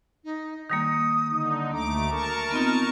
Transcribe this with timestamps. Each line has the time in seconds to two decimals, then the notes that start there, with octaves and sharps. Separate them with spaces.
0.24 D#4
0.70 D#3 G3 A#3 D#6
1.28 D3 D#4
1.73 D2 A3 A#5 D6
2.11 A#4 A5 C#6
2.51 B3 C4 D#4 F4